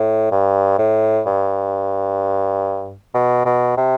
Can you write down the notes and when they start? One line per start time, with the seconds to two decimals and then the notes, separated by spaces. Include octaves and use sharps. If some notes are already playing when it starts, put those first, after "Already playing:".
Already playing: A2
0.31 G2
0.79 A2
1.26 G2
3.14 B2
3.45 B2
3.77 C3